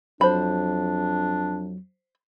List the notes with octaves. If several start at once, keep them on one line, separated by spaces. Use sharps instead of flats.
F2 F#3 D4 C5 B5